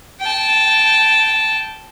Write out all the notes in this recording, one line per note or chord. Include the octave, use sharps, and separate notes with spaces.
G5 A5